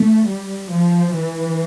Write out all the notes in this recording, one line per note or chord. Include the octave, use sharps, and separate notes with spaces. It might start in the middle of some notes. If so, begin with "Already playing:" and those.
Already playing: A3
G3
F3
E3